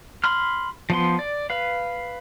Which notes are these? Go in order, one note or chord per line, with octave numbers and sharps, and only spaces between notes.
B5 C6 F6
F3 B3 C6
D5
B4 F5